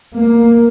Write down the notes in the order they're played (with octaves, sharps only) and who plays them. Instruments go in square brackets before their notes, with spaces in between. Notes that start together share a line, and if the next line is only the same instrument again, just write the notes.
[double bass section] A#3